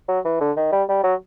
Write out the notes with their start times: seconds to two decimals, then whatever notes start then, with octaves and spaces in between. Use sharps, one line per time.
0.09 F#3
0.25 E3
0.41 D3
0.57 D#3
0.72 G3
0.89 G3
1.04 F#3